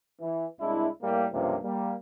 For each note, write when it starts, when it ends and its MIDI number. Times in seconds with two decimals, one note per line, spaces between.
0.21 0.45 52
0.61 0.87 36
0.61 0.87 56
0.61 0.87 62
0.61 0.87 64
1.02 1.26 45
1.02 1.26 55
1.02 1.26 58
1.32 1.56 37
1.32 1.56 43
1.32 1.56 48
1.32 1.56 53
1.32 1.56 58
1.63 1.95 55
1.63 1.95 58